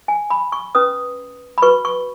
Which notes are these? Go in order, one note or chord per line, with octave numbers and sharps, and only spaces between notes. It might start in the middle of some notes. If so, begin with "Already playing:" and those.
G#5
B5
C#6
C#4 B4 D#6
B5
F#4 B4 C#6
C#6